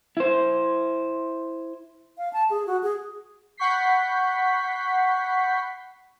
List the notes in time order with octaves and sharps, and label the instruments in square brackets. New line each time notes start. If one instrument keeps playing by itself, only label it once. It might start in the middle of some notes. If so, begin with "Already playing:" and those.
[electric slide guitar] E4 C5
[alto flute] F5
A5
G#4
F#4
G#4
[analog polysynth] F#5 B5 C#6 G6 B6 C7